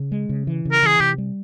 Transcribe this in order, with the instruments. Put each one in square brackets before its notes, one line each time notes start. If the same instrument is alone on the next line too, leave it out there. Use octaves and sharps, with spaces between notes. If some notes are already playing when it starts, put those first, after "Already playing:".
Already playing: [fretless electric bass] C#3
G#3
C#3
E3
C#3
[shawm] A#4
[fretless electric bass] E3 [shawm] G#4
[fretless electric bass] C3 [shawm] G4
[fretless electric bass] G3